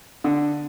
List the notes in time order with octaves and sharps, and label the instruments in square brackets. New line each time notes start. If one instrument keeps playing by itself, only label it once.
[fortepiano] D3